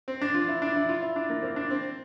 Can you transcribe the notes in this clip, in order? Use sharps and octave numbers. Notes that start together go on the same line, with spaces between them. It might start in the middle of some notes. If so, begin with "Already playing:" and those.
C4
D4
F4
E4
D4
E4
F4
E4
D4
A#3
C4
D4
C4